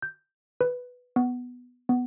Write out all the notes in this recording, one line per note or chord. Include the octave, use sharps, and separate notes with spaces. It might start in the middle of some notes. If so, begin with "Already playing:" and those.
G6
B4
B3
B3